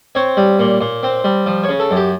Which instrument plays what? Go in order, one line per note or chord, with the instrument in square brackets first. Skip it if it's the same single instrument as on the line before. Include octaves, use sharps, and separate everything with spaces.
[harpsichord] C4 C#5
G3
A#2
A#2
C4
G3
F3
C#5
C#3
A4
F#2 G4